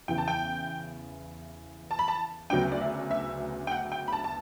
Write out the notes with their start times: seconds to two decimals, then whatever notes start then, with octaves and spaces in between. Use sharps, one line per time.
0.08 E2 C#3 E3 G5
0.18 A5
0.28 G5
1.91 A5
1.99 B5
2.08 A5
2.50 D2 C#3 F#3 B3 D4 G5
2.72 D5
2.81 E5
3.11 E5
3.67 G5
3.71 F#5
3.92 G5
4.08 B5
4.12 A5
4.24 A5